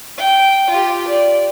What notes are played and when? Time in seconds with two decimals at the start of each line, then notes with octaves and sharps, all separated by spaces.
0.17 G5
0.70 F4 G4
1.08 D5